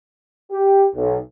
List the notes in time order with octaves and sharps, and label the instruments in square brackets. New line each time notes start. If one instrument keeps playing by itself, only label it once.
[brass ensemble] G4
B1